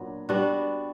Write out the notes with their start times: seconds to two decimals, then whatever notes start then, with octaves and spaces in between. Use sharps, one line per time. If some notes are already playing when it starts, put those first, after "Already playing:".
Already playing: A#2 F#3 B3 D4
0.29 G3 B3 D4 F#4